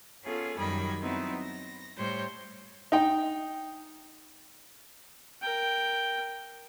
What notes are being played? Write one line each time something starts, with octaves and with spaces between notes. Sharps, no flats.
B3 C#4 F4 G#4 A4
F#2 D#3 G3 D#5 B5 G#6
F#3 B3 C4 D#4 E4
A#6
A2 G3 C5 C#5 G6
D#4 G5
A#4 G5